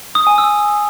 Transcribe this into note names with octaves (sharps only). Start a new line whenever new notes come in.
D#6
G#5
E6